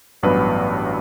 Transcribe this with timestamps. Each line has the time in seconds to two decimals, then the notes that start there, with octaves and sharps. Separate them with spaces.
0.23 A1 G2 F#3 B3 B4